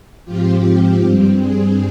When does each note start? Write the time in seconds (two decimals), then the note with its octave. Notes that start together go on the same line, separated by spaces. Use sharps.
0.24 G#2 F3 C4 F4 G4
1.02 G2 G3 C4
1.40 G#4